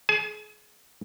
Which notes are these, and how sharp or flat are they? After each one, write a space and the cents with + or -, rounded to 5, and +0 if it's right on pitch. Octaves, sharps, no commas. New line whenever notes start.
G#4 +30 G#5 +40